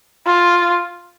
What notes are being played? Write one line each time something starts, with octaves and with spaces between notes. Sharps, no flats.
F4